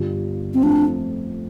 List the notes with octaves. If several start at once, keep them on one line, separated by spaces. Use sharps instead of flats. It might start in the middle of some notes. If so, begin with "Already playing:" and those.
Already playing: G1 G2 G3 F4
C4
F2 F3 A3 D4